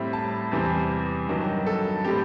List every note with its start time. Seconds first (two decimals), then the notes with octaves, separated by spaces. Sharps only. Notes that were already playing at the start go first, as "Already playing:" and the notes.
Already playing: A2 G3 C4 E5
0.13 A5
0.52 E2 C3 E3 G3 C4
1.29 G2 D#3 F#3
1.66 A4
2.04 A2 G3 C4 G4